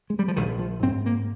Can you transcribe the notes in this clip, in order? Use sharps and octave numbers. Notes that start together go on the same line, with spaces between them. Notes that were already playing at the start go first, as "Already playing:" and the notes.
G#3
G3
F3
A#1 D#3
F3
G#2 C4
A#3